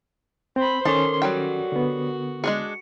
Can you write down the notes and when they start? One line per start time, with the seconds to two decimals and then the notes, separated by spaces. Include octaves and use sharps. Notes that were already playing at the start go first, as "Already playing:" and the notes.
0.56 C4 C5 B5
0.85 D#3 C#4 A4 A#4 C#5 A5 C6
1.22 F#3 G3 F#4 G5
1.72 D3 B3
2.44 G#3 D4 G#4 C#7